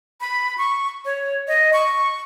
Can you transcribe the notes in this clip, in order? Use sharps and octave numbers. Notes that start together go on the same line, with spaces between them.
B5
C#6
C#5
D#5
C#6